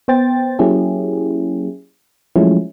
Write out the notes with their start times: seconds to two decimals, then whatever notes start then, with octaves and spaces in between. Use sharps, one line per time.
0.08 B3 C5 G5 A6
0.59 F#3 A#3 C#4 E4 G4 G#4
2.36 F3 F#3 G#3 A3 C#4 E4